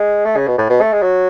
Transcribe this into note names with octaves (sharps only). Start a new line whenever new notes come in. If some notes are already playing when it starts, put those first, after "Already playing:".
Already playing: G#3
A3
C#3
B2
A2
B2
A3
G#3
F#3